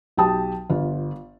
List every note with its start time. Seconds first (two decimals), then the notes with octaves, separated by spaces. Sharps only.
0.17 B1 G4 G5 A5 D#6
0.70 G1 F4